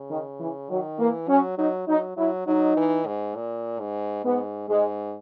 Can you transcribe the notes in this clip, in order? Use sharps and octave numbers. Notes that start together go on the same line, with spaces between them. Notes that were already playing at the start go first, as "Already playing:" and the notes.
Already playing: C#3
D#3
E3
D#3 F#3
E3 A#3
F#3 C#4
F#3 D#4
F#3 D#4
F#3 E4
F#3 D#4
E3
G#2
A#2
G#2
G#2 B3
G#2 G#3